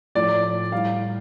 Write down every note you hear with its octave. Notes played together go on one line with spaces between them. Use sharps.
A2 F3 D5
A2 G3 F5